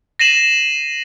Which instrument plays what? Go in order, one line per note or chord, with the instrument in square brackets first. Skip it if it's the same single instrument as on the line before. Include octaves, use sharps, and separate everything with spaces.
[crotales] A#6 C7 D#7 E7 F#7